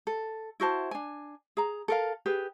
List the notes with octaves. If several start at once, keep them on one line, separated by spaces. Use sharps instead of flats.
A4
E4 F#4 C5 A5
D4 G#5
G#4 A#5
A4 A#4 F5
G4 G#4 B4